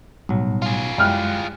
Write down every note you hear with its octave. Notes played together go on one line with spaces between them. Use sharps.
B1 A2 F#3 G3
F4 G#4
F#2 G3 G#3 E4 G5 F6 F#6